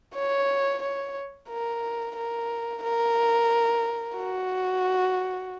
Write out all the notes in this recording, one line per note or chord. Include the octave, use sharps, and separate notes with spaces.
C#5
C#5
A#4
A#4
A#4
F#4